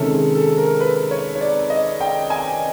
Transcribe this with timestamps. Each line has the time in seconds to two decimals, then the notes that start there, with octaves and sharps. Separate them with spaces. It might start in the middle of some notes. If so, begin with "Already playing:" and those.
Already playing: C3 D#3 G#3 C#4 A4
0.12 G#4
0.35 A4
0.58 A#4
0.81 B4
1.11 C#5
1.35 C#5
1.41 D5
1.70 D#5
2.01 G5
2.30 G#5